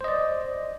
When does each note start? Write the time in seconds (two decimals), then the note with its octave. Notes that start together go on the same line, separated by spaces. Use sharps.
0.01 C5
0.04 D#5
0.08 D5